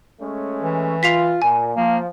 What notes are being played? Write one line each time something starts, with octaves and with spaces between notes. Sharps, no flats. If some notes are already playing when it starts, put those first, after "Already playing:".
G#3 A3 C#4
E3
F4 B6 C7 F7
A#2 G#5
F3 A#3